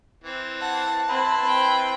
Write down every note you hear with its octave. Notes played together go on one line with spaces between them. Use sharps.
E3 C4
F#5 A5
C4 E4 B4 C6
C4 G5